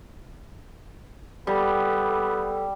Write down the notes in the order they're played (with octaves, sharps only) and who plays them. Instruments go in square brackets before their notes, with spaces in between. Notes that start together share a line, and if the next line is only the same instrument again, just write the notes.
[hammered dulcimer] G3 [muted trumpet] B3 [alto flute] A4